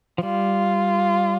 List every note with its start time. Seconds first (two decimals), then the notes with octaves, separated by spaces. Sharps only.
0.18 F3
0.23 G3 F4